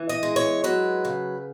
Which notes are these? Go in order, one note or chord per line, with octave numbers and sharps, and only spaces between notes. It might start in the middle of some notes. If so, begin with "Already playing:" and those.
Already playing: E3
D#5
G#3
C#5
F#3 B4
C#3